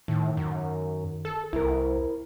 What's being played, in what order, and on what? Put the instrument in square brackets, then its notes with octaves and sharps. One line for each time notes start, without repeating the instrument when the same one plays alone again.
[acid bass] A2 [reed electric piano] D#3
[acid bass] F#2
A4
[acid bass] C2 [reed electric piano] E4 A#4